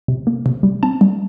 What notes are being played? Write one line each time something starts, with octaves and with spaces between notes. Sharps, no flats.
C3
A#3
C3
G3
C4 A5
G3